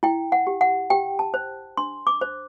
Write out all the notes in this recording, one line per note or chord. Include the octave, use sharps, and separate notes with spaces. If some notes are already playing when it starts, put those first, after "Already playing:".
E4 G5
F#5
G4
F#5
G4 G5
A5
C5
D4 C6
D6
C5